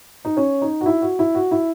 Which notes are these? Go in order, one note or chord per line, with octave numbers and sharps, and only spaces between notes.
D#4
C#4
D#4
F#4
E4
F#4
E4
F#4
E4